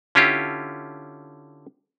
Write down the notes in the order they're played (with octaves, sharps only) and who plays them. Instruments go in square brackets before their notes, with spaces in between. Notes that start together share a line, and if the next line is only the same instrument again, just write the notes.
[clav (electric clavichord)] D3 C#4 E4 F4 G4